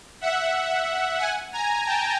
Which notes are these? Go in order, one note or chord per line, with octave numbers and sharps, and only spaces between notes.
E5 F#5
F#5 G#5
G#5 A#5
G5 A5